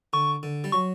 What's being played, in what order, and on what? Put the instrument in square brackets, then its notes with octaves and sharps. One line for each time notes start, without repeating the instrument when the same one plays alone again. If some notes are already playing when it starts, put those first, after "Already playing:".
[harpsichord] D3 [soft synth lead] C#6
[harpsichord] D3
G3
[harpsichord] F#3 [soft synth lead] C#6